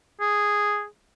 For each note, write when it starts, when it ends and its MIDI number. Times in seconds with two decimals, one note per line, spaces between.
0.21 0.85 68